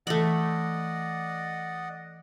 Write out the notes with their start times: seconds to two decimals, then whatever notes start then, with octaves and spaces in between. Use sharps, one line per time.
0.07 E3 A3 D5 D#5 F#5 B5